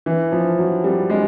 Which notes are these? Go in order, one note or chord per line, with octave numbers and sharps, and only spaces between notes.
E3
F3
F#3
G3
G#3